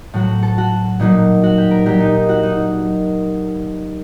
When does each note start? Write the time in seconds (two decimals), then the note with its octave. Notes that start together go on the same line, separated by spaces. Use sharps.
0.14 A2 F#3 F#4
0.43 A4
0.58 F#4
0.99 A#2 F#3 D#4
1.43 F#4
1.58 G4
1.71 A#4
1.86 A#2 F#3 G4
2.00 D#4
2.15 D#4
2.29 F#4
2.43 D#4
2.56 D#4